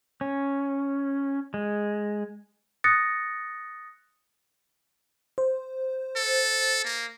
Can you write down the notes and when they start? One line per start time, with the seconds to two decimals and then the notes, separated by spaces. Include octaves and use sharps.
0.21 C#4
1.54 G#3
2.84 D#6 F#6 A6 A#6 C#7
5.38 C5
6.16 A4
6.84 A#3